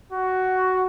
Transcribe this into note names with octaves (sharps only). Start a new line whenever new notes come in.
F#4